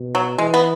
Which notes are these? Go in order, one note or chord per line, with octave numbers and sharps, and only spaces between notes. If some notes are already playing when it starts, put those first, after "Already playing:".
Already playing: B2
F#3
E3 G#3
B3